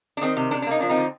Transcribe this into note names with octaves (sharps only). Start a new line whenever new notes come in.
D4
D#3 C4
C3
C3 D4
D4
A#3 D#4
F3 D4
C4 D#4
D3